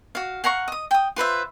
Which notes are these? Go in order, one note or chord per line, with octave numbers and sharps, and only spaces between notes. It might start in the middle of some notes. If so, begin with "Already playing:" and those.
F#4 F5
F5 F#5 A#5 C#6
D#5 D#6
G5 D#6
F4 B4 C5 E5